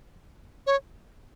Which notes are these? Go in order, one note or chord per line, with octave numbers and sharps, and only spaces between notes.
C#5